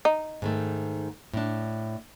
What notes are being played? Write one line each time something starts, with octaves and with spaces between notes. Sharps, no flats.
D#4
G#2 D#3 A3
A2 D4